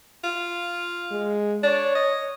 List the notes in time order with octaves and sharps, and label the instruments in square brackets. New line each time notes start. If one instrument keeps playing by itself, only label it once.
[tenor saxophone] F4
[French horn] G#3
[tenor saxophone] D4 [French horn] C#5
[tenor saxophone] D#5